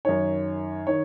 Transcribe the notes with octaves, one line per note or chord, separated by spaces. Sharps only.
F#2 D#3 C#5
D#3 C#5